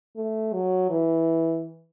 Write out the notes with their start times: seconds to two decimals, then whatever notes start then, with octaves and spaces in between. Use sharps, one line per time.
0.16 A3
0.53 F#3
0.90 E3